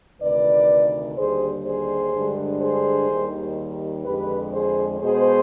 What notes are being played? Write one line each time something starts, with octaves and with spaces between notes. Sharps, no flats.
D2 C3 D#3 B4 D5
D#2 D3 G3 G#4 C5
G#4 C5
G2 D3 G#3
G#4 C5
D#2 D#3 G3
F2 D3 G#3 G4 B4
G#4 C5
B2 G#3 G#4 C5